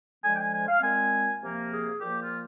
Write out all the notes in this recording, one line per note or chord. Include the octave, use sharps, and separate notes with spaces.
D3 F3 G#3 G#5
G5
G#5
G#5
F5
A#2 G#3 C4 G#5
C3 F3 A#3
G#4
A#2 F3 A#3 G4
F4